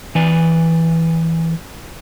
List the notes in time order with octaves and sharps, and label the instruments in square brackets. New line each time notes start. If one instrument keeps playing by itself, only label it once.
[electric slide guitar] E3 B4 D5